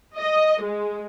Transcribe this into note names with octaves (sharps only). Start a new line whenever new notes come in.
D#5
G#3